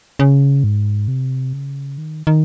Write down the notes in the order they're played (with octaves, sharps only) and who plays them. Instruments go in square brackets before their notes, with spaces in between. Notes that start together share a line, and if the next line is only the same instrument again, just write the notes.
[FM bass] C#3
G#2
C3
C#3
D#3
D#3